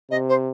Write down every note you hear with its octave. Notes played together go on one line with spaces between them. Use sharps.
C3 D#5
C5